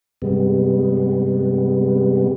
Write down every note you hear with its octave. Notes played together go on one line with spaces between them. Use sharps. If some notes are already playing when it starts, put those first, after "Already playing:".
G2 C3 G3 G#3 B3